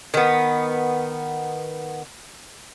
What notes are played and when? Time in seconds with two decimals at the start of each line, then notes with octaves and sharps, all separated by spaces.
0.14 D#3 B3